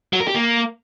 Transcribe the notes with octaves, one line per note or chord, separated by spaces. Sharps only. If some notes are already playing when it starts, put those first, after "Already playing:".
F#3
A#4
G4
A#3